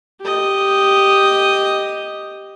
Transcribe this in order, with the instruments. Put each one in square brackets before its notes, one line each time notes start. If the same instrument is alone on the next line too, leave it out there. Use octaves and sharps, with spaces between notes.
[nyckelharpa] G4 D#5